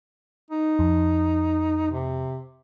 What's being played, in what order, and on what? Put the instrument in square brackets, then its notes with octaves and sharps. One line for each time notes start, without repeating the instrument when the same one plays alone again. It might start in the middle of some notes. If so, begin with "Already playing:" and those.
[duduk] D#4
[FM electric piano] F2
[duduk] C3